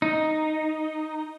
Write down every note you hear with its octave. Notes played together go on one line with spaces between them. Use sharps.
D#4